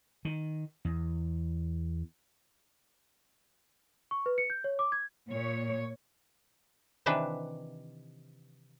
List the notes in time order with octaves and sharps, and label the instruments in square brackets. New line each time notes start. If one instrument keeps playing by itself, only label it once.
[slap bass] D#3
E2
[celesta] C#6
B4
C#7
G6
C#5
D6
G#6
[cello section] A#2 C#5
[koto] C3 D#3 E3 D4 B4 E5